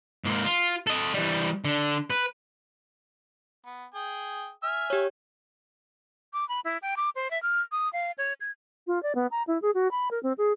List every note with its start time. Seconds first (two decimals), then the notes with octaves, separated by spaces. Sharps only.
0.25 G#2 A#3
0.45 F4
0.87 A4 D#5
1.14 E3 G3
1.65 D3
2.10 B4
3.66 B3
3.95 G#4 G5 D#6
4.63 E5 G#5 F6
4.90 G4 C#5
6.33 D6
6.49 B5
6.65 E4
6.82 G5
6.97 D6
7.16 C5
7.31 E5
7.43 F6
7.72 D#6
7.93 F5
8.18 C#5
8.41 G#6
8.87 F4
9.03 D5
9.15 B3
9.31 A#5
9.47 E4
9.62 G#4
9.74 F#4
9.91 B5
10.11 A#4
10.23 C4
10.38 G#4